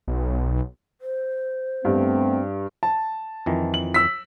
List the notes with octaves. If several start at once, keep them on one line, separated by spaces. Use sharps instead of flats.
B1
C5
G2 A3 B3 C4
A5
F2 D#3 E3
F#7
E6 B6